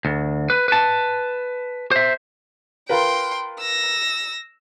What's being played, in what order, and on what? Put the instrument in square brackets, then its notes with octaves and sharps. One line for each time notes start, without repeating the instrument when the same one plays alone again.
[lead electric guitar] D2
B4
B4 A5
C5 E5
[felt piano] F4 A#4 B4 [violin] G5 C6
[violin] E6 A#6